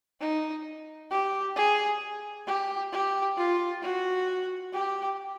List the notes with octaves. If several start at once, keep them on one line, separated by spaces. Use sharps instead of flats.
D#4
G4
G#4
G4
G4
F4
F#4
G4